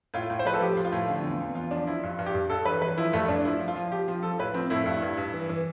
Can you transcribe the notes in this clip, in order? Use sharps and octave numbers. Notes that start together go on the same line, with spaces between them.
A2 F4
A2
C5
F3 B4
A4
F3 G4
F3
F4
A2
D3 F4
E2
E2
E2 F4
F3 D4
F3 E4
G2
G2
G4
G2
G2 A4
E3 B4
E3 B4
F3 E4
G2 A3
G2 D4
F3 E4
F3
F4
F3
F3 G4
F3
F3 A4
A2 B4
F3 C4
A2 E4
G2
G2
G2
E3
E3